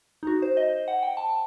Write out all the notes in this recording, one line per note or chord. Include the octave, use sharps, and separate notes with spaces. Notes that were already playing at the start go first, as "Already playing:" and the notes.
D#4
F#4
C5
D#5
F#5
G5
A5